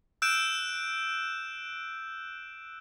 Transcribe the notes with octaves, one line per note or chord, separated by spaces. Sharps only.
E6 F#6 G6 D7 E7